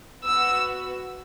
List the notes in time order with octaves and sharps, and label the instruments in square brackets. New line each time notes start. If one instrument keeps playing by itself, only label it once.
[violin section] B3 F#4 E6